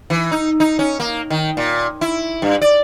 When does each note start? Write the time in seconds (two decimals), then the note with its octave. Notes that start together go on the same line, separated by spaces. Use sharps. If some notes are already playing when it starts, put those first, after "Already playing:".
0.10 E3
0.32 D#4
0.60 D#4
0.79 C#4
1.00 A#3
1.30 D#3
1.57 A#2
2.01 E4
2.42 G2
2.61 D5